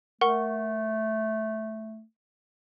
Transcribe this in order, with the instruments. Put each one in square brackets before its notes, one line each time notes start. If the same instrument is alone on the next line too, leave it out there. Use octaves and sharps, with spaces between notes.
[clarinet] A3 [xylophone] A#4 F#5 C#6